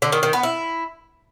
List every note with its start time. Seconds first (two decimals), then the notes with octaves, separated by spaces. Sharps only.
0.02 D3
0.12 D#3
0.23 D#3
0.33 B3
0.43 E4